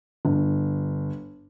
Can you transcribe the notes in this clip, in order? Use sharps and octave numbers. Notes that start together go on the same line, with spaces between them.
G1